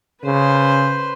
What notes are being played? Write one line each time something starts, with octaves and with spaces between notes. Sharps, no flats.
C#3 B4 C5